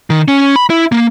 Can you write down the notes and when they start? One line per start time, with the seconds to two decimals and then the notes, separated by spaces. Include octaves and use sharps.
0.10 D#3
0.28 C#4
0.56 B5
0.70 E4
0.92 A#3